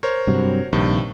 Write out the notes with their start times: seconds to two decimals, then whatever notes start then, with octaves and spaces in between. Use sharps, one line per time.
0.03 A#4 C5 C#5
0.27 G2 C3 F#3
0.73 A#1 G2 C3 D#3